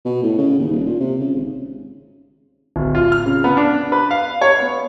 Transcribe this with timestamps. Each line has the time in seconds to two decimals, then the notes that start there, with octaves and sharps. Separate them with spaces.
0.05 B2
0.23 A2
0.38 C#3
0.58 D#2
0.71 D#1
0.86 A#2
1.00 C3
1.20 C#3
1.35 G#1
2.76 D1
2.95 F4
3.12 F6
3.26 C#3
3.44 B3
3.57 D4
3.92 B4
4.11 F5
4.42 C#5
4.60 B3